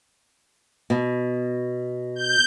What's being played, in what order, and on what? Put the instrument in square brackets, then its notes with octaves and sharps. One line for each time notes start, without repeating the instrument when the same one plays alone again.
[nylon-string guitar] B2
[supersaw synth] G6